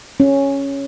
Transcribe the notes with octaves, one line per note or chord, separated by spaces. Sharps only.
C#4